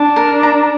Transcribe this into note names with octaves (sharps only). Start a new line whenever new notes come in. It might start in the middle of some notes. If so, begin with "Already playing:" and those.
Already playing: D4 A5
A#4
A#5